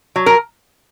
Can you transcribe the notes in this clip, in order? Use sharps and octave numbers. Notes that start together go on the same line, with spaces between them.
F#3
A#4